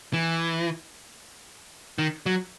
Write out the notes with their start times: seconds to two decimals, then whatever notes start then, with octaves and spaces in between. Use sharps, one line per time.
0.13 E3
1.99 D#3
2.26 F#3